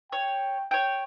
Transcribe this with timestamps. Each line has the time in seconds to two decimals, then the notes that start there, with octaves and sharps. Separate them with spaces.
0.12 C#5 G5
0.71 C#5 G5